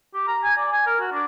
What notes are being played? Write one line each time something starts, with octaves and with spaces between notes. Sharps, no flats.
G4
A#5
G#5
D5
G#5
A#4
F#4
D4